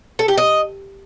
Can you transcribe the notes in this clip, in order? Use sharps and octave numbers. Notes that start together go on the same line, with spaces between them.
A4
G4
D#5